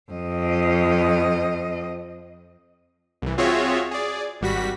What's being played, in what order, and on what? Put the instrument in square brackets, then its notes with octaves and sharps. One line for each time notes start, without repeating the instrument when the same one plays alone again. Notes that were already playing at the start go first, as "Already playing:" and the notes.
[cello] F2 D#5
[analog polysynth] C2 E3
C4 F4 F#4 G#4 C#5 E5
G#4 D5
G#1 G3 F#4 B6